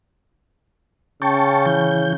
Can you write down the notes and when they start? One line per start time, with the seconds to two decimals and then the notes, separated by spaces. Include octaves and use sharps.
1.22 C#3 G5 A5 C#6
1.66 E3 G6